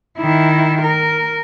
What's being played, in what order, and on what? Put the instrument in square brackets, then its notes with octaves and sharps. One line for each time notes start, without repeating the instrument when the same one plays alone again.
[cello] D#3 E4
A#4